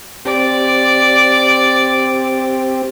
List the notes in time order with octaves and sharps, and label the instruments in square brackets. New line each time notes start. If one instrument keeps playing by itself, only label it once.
[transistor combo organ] C4 G4 [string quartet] D5